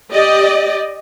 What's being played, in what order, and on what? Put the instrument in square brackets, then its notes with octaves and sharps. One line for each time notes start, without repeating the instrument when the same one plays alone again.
[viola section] G4 D5 D#5